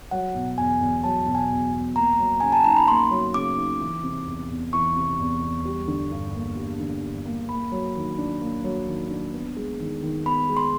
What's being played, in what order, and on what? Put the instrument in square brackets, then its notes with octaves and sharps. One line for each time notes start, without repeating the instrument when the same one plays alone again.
[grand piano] F#3 [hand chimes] F#5
[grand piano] B2
[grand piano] E2 [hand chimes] G#5
[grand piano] E2
[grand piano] F#3 [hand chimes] A5
[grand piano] B2
[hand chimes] G#5
[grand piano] E2
E2
[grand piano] A#3 [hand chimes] A#5
[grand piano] F#3
[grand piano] C#3 [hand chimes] G#5
[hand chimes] A5
[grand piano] D#4 [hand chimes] A#5
[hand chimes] B5
[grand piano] A#3 [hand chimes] C6
[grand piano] F#3
[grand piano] C#3 [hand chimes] D6
[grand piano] D#4
E3
C3
E2
E2
[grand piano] E3 [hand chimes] C#6
[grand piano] C3
E2
E2
G3
D3
G2
A#3
G3
D3
G2
A#3
[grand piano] A#3 [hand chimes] B5
[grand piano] F#3
D#3
D4
A#3
F#3
D#3
D4
B3
G#3
D#3
D#3
[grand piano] B3 [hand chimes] B5
[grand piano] G#3
[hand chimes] C6